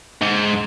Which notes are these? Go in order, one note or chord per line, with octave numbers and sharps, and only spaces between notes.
G#2